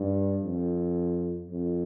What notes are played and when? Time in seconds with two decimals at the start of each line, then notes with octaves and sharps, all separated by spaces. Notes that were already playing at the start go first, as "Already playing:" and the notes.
Already playing: G2
0.44 F2
1.51 F2